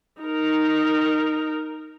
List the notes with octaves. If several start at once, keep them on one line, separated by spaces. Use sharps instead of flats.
D#4 A#4